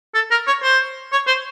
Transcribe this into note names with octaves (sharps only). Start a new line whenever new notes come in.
A4
A#4
C#5
C5
C#5
C5